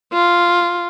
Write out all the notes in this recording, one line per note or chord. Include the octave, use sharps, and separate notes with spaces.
F4